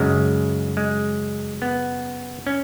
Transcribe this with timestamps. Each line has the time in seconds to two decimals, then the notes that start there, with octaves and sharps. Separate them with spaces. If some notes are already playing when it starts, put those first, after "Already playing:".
Already playing: F#2 C#3 G#3
0.77 G#3
1.62 B3
2.47 C#4